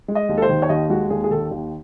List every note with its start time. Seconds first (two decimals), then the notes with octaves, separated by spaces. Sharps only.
0.08 G#3
0.15 D#5
0.29 D#2
0.37 A4
0.42 C5
0.49 D#3
0.62 C#5
0.69 D#2 D#5
0.90 G#3 F#4
1.10 D#2 G#4
1.24 G#4
1.31 D#3 A4
1.51 D#2